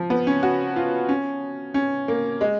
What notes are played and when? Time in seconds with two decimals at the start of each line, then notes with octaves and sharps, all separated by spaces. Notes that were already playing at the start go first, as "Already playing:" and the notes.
Already playing: F3
0.10 B3
0.27 C#4
0.43 F#4
0.76 F4
1.09 C#4
1.74 C#4
2.08 A#3
2.41 G#3